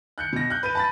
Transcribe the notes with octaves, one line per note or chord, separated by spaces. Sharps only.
F#6 G6 C#7
B2 A#6
F#6 G6
B4 G6 D#7
A5 B5 A6